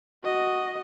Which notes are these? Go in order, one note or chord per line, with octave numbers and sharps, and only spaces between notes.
F#4 D#5